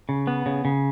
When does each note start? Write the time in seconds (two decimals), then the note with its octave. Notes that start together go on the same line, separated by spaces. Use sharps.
0.09 C#3
0.27 B3
0.46 C#3
0.65 C#3